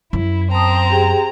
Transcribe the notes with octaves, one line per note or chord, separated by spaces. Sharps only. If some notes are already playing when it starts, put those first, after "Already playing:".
F#2 E4
C4 A5 A#5 D#6
G4 G#4 G5